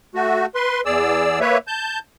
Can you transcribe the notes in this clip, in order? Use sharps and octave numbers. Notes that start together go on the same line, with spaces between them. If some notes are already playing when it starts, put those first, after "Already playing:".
A3 F#4
B4 C6
E2 G#4 D5 E6
A#3 B4 C#5 E5
A5 G6